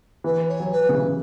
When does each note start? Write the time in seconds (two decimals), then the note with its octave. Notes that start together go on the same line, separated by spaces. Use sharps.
0.24 E3 B4
0.48 C#5
0.60 F#3
0.71 B4
0.89 C#3
0.94 E3